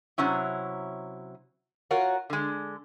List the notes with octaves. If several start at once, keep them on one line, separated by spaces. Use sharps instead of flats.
C3 F#3 C#4 E4
F4 F#4 A#4 C#5
D3 G#3